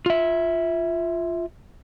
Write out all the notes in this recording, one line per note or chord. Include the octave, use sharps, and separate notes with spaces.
F4 E5